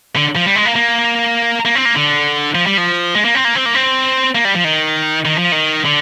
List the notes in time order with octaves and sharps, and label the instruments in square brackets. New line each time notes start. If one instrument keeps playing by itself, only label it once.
[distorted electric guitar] D3
F3
G3
G#3
A#3
A#3
A#3
C4
A#3
D3
F3
G3
F3
G#3
A#3
C4
A#3
C4
A#3
C4
A#3
G3
F3
D#3
D#3
F3
D#3
D3